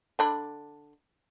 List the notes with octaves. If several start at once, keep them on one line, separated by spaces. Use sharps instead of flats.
D3 D4 B5